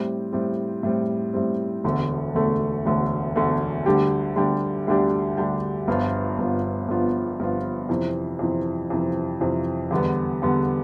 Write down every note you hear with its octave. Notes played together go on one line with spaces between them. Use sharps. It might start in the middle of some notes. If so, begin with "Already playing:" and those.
Already playing: A2 G3 C4
A2 G3 C4
A2 G3 C4
A2 G3 C4
E1 D2 D3 A3
E1 D2 D3 A3
E1 D2 D3 A3
E1 D2 D3 A3
D2 D3 G3 D4 G4
D2 D3 G3 D4 G4
D2 D3 G3 D4 G4
D2 D3 G3 D4 G4
G1 G2 F3 B3 F4
G1 G2 F3 B3 F4
G1 G2 F3 B3 F4
G1 G2 F3 B3 F4
F2 C3 E3
F2 C3 E3
F2 C3 E3
F2 C3 E3
E2 D3 G3 B3
E2 D3 G3 B3